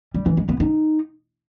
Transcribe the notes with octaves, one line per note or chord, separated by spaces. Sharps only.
G3
E3
G#3
B3
D#4